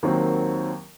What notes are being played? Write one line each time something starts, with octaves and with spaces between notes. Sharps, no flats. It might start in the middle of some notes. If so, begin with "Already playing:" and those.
D#2 D#3 F#3 C4